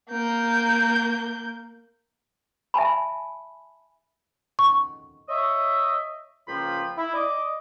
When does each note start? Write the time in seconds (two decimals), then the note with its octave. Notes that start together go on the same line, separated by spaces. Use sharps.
0.10 A#3 G6
2.74 E5 G#5 A5 B5
4.59 C#6
5.29 C#5 D#5 E5
6.48 C#2 F3 A#3 F4 G5 B5
6.97 E4
7.14 D5 D#5 D6